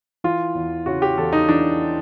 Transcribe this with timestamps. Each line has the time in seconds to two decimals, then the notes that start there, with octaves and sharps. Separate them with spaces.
0.24 E3 F4
0.55 E2
0.86 C#3 F#4
1.02 G4
1.17 E2 A4
1.33 D#4
1.49 E3 D4